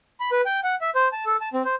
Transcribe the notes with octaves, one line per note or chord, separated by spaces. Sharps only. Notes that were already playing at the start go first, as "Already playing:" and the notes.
B5
B4
G5
F#5
E5
C5
A5
A4
A5
C4
C5